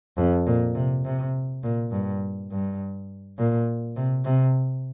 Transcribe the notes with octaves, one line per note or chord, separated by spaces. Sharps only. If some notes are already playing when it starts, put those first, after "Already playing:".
F2
A#2
C3
C3
A#2
G2
G2
A#2
C3
C3